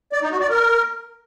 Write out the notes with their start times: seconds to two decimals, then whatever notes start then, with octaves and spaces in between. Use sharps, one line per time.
0.12 D5
0.22 D#4
0.31 F#4
0.40 D5
0.50 A#4